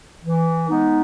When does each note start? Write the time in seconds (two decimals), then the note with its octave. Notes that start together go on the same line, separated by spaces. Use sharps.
0.24 E3
0.69 G#3 B3 D#4